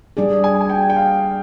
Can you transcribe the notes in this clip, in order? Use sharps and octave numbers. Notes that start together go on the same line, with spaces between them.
G3 D4 G#4 D5
G#5
G#5
G5
G5
F5